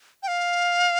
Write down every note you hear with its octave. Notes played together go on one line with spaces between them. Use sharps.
G5
F5